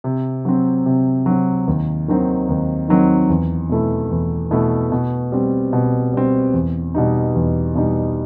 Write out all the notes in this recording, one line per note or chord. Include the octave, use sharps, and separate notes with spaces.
C3
F#3 C4
C3
F#3 C4
D#2
D#3 F#3 C4 D#4
D#2
D#3 F#3 C4 D#4
E2
B2 A3 E4
E2
B2 A3 E4
B2
G3 C4
B2
G3 C4
E2
B2 G3 D#4
E2
B2 G3 D#4